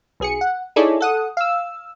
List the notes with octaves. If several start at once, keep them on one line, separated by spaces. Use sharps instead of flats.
B1 G#4 C#7
F#5
D#4 E4 G#4 A4 C#5 D5
A4 F#5 D#6
F5 E6